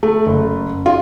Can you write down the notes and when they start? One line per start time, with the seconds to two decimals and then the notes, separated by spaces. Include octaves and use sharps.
0.03 A3
0.26 F#1
0.86 F4